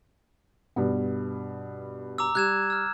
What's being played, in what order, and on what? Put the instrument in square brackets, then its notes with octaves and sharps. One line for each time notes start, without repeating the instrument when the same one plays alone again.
[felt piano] G2 B2 B3
[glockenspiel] A#5 D6 E6
[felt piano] G3 [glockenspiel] F#6 G#6 E7
[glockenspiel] E6 F6